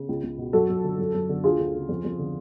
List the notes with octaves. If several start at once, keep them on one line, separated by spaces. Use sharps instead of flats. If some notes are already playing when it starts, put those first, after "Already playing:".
Already playing: C#3
C#2
C#2
B2
F#2 F#4 A4
F#2
D3
F#2
F#2
D3
D2 F4 G#4
D2
C#3
F2
F2
D3